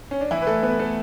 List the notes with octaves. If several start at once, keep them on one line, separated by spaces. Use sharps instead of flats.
C#4
D4
E3 E4
B4
A3 A4
B3 B4
A3 A4